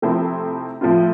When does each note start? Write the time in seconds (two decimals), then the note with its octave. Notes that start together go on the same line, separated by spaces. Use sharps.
0.02 C3 F3 A3 C4 E4
0.81 A2 F3 C4 F4